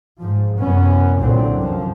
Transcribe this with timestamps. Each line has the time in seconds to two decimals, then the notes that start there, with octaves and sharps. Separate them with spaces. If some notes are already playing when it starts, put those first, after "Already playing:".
0.19 G#2 F3
0.59 C2 F#2 B3 C#4
1.19 C2 A#2 D3 F#3 C4
1.56 F#2 F3